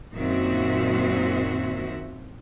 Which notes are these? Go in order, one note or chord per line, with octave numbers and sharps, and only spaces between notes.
F#2 A#2 D#3 C4 F#4 E5